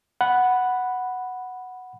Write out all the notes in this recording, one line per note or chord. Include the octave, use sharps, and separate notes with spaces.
F#5 B5